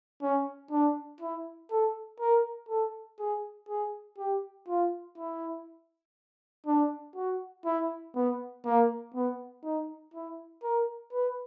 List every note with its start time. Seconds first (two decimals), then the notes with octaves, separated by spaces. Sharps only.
0.22 C#4
0.71 D4
1.20 E4
1.71 A4
2.20 A#4
2.69 A4
3.19 G#4
3.69 G#4
4.18 G4
4.68 F4
5.18 E4
6.66 D4
7.16 F#4
7.65 E4
8.15 B3
8.65 A#3
9.14 B3
9.64 D#4
10.14 E4
10.63 A#4
11.13 B4